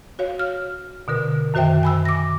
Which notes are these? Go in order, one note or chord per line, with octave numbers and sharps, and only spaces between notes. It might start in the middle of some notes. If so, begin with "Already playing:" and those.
F#4 C#5 F5
F6
B2 D3 A#4
F#2 D#3 F#4 C5 E5 G5
G#5 B5 E6
D6 A#6